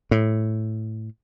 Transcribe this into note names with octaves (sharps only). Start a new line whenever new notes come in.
A2